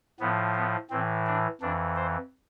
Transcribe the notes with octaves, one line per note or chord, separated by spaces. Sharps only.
A2 F3 B3
B3
A2 E3 C4
D4
F2 E3 D4
C5